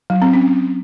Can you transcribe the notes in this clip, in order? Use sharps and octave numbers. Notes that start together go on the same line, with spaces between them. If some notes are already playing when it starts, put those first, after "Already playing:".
F#3
C4
C#4